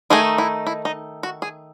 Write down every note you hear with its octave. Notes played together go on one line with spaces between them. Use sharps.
D#3 A3 D#4 G#4
E4
E4
D#4
F#4
G#4